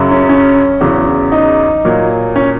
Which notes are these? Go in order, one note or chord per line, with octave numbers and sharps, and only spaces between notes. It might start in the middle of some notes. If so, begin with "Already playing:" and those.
Already playing: F#2 C#3 F#3
C#4
C#4
E2 C#3 F#3
D#4
A#2 F#3
C#4